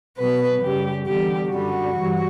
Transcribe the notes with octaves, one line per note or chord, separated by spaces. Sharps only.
B2 F#3 B4
F#2 C#3 G3 G4
E2 D3 G3 G4
F#2 D3 G3 F#4
G2 E3 G3